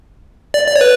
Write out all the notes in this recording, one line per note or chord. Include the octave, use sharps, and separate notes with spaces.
D5
D5
C#5
B4